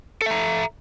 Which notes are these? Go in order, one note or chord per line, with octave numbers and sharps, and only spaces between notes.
A4 E5 A#5